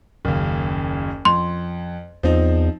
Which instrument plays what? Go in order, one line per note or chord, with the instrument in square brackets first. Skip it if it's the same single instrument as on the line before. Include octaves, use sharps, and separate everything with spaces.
[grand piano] F#1 D#2
[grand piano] F2 [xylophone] C6
[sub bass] E2 [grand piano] F3 C4 D#4